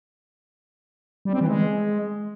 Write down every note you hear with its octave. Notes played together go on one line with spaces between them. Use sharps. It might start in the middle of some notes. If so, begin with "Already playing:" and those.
G3
C4
E3
G#3